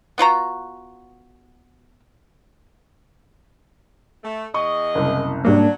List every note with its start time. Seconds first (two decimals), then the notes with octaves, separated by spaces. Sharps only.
0.18 B3 F4 F#4 A#5
4.24 A3
4.54 E2 G#4 D#5 C#6
4.95 F#1 C2
5.45 G#2 F#3 G3 A#3 D4